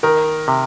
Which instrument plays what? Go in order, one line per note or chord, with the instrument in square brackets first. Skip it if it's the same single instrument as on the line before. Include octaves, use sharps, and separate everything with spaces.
[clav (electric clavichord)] D#3 [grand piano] A#4
[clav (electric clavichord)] C3